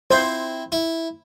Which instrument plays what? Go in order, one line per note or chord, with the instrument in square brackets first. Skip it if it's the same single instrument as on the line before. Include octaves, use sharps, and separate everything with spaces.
[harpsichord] C4 E4 [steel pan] C5
[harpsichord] E4